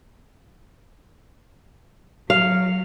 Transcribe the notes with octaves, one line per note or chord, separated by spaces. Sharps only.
F#3 F5